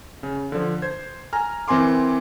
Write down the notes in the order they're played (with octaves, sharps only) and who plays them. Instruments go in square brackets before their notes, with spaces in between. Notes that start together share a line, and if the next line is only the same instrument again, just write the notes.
[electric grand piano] C#3
D3 F3
C5 G#6
G#5 A#5 F6
E3 C4 A#4 G#5 C6 D6